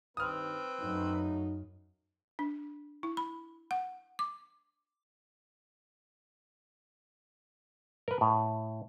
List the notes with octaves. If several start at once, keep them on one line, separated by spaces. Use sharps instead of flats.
G2 D#3 C4 B4 D#6 F6
F#2 F#3 A3 D#4
D4
E4
B5
F#5
D6
A#4 B4
A2